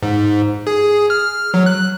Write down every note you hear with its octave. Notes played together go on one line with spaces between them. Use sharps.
G#2
G#4
F6
F#3
F#6